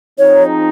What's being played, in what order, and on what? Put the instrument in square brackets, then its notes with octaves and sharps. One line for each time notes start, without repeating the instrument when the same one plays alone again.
[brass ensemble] F3 C4 D#4 G#4 [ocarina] C#5